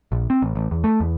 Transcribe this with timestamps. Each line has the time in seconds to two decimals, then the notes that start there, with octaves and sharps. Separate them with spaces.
0.12 A#1
0.30 C4
0.42 A1
0.55 A1
0.71 E2
0.84 A3
1.00 E2